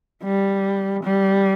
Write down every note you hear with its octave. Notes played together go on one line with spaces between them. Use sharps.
G3
G3